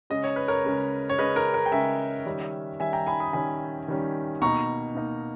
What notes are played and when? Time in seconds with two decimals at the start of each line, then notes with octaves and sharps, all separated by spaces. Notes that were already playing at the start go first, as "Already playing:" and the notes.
0.10 C#3 G#3 C#4 D#5
0.24 C#5
0.36 B4
0.48 A#4 C#5
0.64 C#3 G#3 C#4
1.09 C#5
1.18 C#3 G#3 C#4 B4 D#5
1.36 A#4
1.54 A#4
1.66 G5
1.72 C#3 G#3 C#4 E5 G#5
2.26 D#3 G3 C#4
2.80 D#3 G3 C#4 E5 G#5
2.93 G5 A#5
3.07 G#5 B5
3.20 B5 D#6
3.33 D#3 G3 C#4 G#5 B5
3.88 D#3 G3 C#4
4.42 B2 A#3 D#4 A#5 C#6
4.95 B2 A#3 D#4